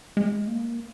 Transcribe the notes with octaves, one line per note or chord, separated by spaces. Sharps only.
G#3
A#3